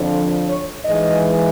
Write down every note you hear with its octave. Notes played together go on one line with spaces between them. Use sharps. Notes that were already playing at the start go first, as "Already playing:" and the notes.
Already playing: F2 D3 F3
C#5
G#2 E3 G#3 D#5